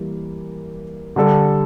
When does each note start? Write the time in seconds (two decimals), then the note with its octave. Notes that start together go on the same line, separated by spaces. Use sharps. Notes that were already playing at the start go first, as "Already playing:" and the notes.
Already playing: E3 G3 A#3
1.16 D3 G3 D4 A4